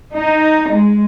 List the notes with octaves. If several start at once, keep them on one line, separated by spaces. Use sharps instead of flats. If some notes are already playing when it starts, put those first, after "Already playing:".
D#4
G#3